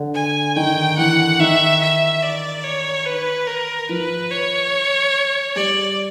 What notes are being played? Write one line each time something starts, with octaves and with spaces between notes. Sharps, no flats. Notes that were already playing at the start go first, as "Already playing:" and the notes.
Already playing: D3
G#5
D#3 G5
E3 F#5
D#3 E5
E5
D5
C#5
B4
A#4
F3 B4
C#5
G3 D5